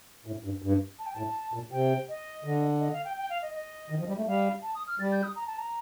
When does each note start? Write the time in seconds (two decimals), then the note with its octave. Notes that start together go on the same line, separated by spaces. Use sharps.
0.26 A2
0.44 G2
0.62 G2
0.99 A5
1.06 G5
1.14 A2 A5
1.54 A#2
1.72 C3 G5
2.09 D#5
2.44 D3
2.80 D#5
2.93 F5
3.05 G5
3.18 G5
3.30 F5
3.42 D#5
3.54 D#5
3.90 D#3
3.99 F3
4.08 G3
4.17 A3
4.27 G3 F5
4.63 A5
4.75 D#6
4.87 F6
4.99 G3 A6
5.12 G6
5.23 D#6
5.36 A#5
5.47 A5
5.58 A#5